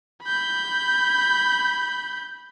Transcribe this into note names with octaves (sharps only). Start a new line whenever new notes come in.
B5 G6